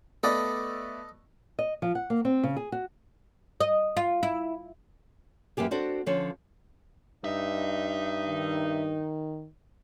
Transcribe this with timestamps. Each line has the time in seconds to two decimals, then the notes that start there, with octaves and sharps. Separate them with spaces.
0.23 A3 B3 A4 D5 D#5
1.59 D#5
1.82 F3
1.95 F#5
2.10 A#3
2.25 C4
2.43 C#3
2.57 G#4
2.72 F#4
3.60 D#5
3.97 F4
4.23 E4
5.57 F#2 E3 A#3 G4 G#4
5.71 C4 D4 F#4 A4 C5
6.06 D3 F3 C#4 C#5
7.24 G2 D#4 E5
8.27 D#3